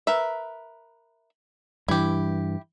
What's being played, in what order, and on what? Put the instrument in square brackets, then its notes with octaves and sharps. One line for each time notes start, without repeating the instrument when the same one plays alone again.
[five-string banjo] A#4 B4 E5
[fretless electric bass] G2 E3 [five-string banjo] E4 G4